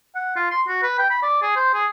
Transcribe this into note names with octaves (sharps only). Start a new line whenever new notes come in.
F#5
F4
C6
F#4
B4
G5
B5
D5
G#4
C5
G#4